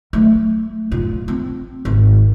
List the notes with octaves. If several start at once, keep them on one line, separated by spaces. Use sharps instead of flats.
F#3 A3
B2 F4
C4
G#1